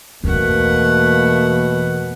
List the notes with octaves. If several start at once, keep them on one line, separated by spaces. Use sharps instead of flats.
E2 B2 A3 A#3 F#5